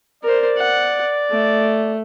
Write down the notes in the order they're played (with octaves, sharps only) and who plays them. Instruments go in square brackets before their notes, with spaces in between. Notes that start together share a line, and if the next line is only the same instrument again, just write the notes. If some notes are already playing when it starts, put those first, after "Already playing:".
[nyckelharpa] A#4 C5 [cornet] D5
[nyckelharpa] F#5
A3